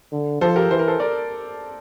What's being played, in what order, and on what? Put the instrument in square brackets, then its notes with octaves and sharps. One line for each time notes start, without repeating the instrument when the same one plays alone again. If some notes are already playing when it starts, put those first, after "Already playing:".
[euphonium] D3
[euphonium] F3 [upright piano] A4 C5
[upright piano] G4 A#4
[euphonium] E3 [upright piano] C5
[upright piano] A#4
A4 C5
A#4 D5